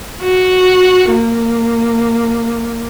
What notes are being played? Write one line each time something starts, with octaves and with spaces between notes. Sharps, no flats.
F#4
A#3